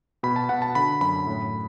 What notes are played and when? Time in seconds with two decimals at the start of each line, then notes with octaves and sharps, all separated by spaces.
0.23 B2 B5
0.36 A5
0.49 B2 F#5
0.62 A5
0.75 D3 B5
1.01 F#2 B5
1.27 A2